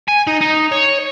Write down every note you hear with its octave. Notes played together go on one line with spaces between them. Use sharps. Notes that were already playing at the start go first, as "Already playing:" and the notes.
G#5
D#4
D#4
C#5